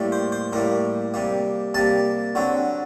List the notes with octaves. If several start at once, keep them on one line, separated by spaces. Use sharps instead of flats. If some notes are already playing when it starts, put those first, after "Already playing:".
Already playing: A2 G3 A#3
C5
C5
A2 G3 A#3 A#4
C3 G3 A#3
C3 G3 A#3 A5
D3 F#3 C4